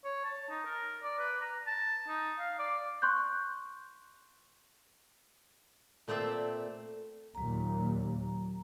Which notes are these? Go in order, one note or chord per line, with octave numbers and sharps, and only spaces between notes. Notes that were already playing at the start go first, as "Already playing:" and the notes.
C#5
A5
D#4
A#4
D5
B4
A#5
A5
D#4
F5
D5
C6 C#6 F#6 G6
A#2 A3 C4 D5 E5
D#2 A#2 F#3 A#5